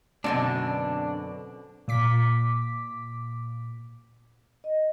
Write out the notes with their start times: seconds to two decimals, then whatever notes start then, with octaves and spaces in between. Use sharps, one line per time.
0.24 F#2 B2 D3 C4 D4
1.88 A#2 D6 B6
4.64 D#5